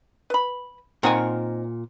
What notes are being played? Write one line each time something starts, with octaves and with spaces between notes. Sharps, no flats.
B4 B5
A#2 D#3 C4 A#4 F#5 G#5